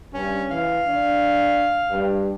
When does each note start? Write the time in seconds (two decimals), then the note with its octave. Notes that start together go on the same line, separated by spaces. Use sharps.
0.14 G2 C#4
0.51 E3 F5
0.87 D4
1.90 G2